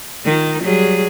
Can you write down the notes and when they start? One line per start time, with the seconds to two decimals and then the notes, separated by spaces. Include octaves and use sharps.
0.25 D#3 D#4 F4
0.63 F#3 G3 G#4